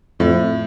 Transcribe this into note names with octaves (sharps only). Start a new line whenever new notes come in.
F2 A2